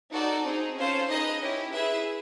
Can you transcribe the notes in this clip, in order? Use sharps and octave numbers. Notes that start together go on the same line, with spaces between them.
D#4 F#4 A4 D5
C4 D#4 G#4
C#4 F4 A4 C5
D#4 G#4 B4 D#5
C#4 E4 G4
E4 G#4 B4 E5